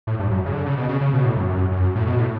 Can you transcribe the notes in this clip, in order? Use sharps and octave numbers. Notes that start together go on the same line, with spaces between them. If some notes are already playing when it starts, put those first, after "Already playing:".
A2
G2
F#2
C#3
D3
C#3
B2
C#3
C#3
B2
A2
F#2
F#2
F#2
A2
B2
A2